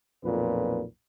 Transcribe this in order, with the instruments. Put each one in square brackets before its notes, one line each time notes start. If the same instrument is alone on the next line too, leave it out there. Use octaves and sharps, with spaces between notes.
[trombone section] B1 F2 A#2 B4